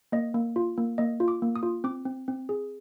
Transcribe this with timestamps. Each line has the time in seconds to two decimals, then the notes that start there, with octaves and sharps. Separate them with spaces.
0.12 A#3 D#5
0.34 A#3
0.56 F4
0.78 A#3
0.98 A#3 D#5
1.20 F4
1.28 D6
1.42 A#3
1.56 D#6
1.63 F4
1.84 C4 D6
2.05 C4
2.28 C4
2.49 G#4